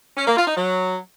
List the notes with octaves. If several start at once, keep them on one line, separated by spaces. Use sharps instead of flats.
C#4
A#3
F4
D#4
F#3